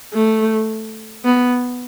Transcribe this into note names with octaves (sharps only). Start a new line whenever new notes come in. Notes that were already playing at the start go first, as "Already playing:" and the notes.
A3
B3